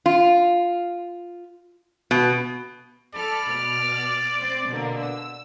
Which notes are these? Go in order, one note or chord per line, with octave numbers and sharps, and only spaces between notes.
F4
B2
A4 D5 B5 F6
B2 F6
C4 C5
B2 D3 A#3
E6